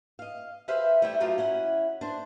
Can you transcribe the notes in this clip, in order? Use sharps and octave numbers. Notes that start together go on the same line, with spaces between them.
D#5 F5
G4 G#4 B4 C5 E5 F5
G3 A3 E4 E5 G5
F#3 A3 D#4 F4 G4
C#4 E4 F#5
D4 C5